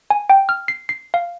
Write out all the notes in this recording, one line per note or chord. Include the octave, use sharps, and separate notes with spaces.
G#5
G5
F6
C7
C7
F5